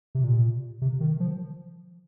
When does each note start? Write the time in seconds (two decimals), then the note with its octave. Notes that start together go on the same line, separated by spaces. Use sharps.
0.15 C3
0.24 A#2
0.82 C3
1.00 D#3
1.20 F3